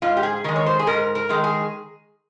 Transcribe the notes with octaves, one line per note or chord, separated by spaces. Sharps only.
G#2 F4
G4
G#4
D#3 G#3 A#4
C#5
C5
G#4
G#2 A#4
A#4
D#3 G#3
G#4